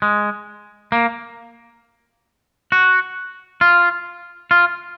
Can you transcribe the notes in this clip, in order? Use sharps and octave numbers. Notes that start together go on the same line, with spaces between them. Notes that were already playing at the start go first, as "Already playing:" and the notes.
G#3
A#3
F#4
F4
F4